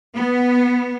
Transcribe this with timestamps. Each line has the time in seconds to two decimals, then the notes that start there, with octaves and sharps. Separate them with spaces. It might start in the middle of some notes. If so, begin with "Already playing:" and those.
0.15 B3